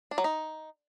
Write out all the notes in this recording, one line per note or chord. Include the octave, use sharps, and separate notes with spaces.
D4
F#3
D#4